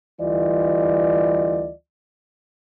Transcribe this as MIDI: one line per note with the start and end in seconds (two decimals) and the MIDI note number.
0.21 1.71 38
0.21 1.71 52
0.21 1.71 55
0.21 1.71 65
0.21 1.71 74
0.21 1.71 75